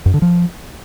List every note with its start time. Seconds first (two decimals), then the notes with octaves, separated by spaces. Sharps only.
0.06 F#2
0.14 D3
0.22 F3